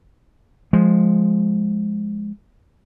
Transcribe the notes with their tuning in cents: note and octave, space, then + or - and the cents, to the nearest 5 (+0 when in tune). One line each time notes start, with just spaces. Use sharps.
F3 +0 G#3 +0